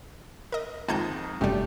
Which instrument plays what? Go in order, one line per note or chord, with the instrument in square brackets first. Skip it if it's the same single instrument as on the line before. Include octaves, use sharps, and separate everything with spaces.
[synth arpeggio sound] A#4 D#5
[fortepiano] F2 G#2 D#3 [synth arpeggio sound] G#3 A5 G6
[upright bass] E1 [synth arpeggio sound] F#2 G3 [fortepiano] A3 G4